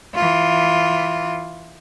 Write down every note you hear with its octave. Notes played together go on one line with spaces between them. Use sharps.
E3 F4